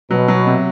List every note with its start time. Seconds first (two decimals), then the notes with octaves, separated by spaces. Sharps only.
0.11 B2 F#3
0.28 F#3
0.46 C3